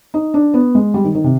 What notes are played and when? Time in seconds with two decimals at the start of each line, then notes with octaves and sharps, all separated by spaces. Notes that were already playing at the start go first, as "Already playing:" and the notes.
0.14 D#4
0.34 D4
0.54 B3
0.75 G#3
0.94 G3
1.04 D#3
1.15 D#3
1.24 C3